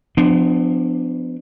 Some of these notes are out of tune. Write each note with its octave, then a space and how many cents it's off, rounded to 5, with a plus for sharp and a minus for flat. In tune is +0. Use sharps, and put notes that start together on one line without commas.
F3 +5 B3 +40 D4 +20